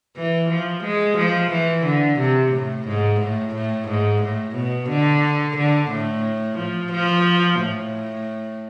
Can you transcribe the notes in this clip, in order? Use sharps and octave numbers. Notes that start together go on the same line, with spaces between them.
E3
F3
G#3
F3
E3
D3
C3
A2
G#2
A2
A2
G#2
A2
B2
D3
D3
A2
F3
F3
A2